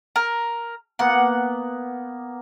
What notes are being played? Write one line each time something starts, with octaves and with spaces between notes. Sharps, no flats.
A#4
A#3 B3 F#5